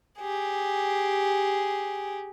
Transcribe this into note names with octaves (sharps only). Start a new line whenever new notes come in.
G4 G#4